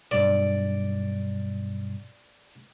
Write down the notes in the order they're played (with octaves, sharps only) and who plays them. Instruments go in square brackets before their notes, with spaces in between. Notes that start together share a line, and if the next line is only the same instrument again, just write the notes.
[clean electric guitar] B1 G2 [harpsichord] D5